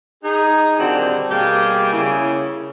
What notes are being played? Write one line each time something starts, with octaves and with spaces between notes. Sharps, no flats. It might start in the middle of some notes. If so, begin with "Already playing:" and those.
D#4 G#4
A#2 D3 D#3 G3 C4 F#4
B2 G3 A#3 G4 G#4
C#3 A#3 E4